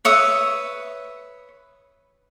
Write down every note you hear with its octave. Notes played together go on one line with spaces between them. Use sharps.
B4 C#5 E5 D#6